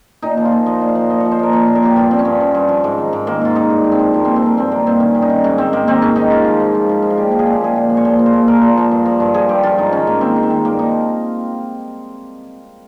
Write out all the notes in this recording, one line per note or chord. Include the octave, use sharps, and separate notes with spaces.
A#2 D#4
F3
F4
A#2
F3 D#5
A#2
F5
F3
A#2 D#5
F3 C#5
C5
A#2 A#4
F3 C#5
A#2
A#4
F3 G4
G2 F4
F3 C4
C#4
G2
F3
G2
F3
G#2
D#3
G#2
D#3 A#3
G#2 F4
D#3 D#4
G2
F3
C4
G2
F3 A#3
G2 C4
C4
F3 A#3
G2 C4
D#3 A#3
G2 C4
D#3 C#4
G2
D#4
D#3
G#2 C#4
D#3 C4
G#2 A#3
D#3 C4
G#2 C#4
D#3 D#4
G#2 F4
F3
G#2
F3
G#2
F3
F4
A#2 G4
F3
G#4
A#2
G4
F3 G#4
A#2
F3
C#5
A#2 C5
F3
C5
A#2
F3 A#4
A#2
F3
G2
F3
G2
F3 G#4
G2 G4
F3 F4
G#2 D#4
D#3 C#4
G#2 A#3
D#3 C4
G#2
C4
D#3
G2 A#3
F3 D#4